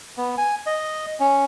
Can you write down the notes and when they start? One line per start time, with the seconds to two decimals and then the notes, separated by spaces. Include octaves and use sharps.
0.18 B3
0.38 G#5
0.66 D#5
1.20 C#4